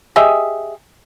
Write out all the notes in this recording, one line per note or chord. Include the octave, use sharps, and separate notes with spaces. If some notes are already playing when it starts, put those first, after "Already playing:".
G4 G#4 D#5 E5